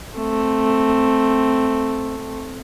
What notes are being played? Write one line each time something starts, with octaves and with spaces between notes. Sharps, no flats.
A3 C4